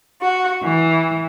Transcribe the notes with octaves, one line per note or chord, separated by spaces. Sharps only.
F#4
E3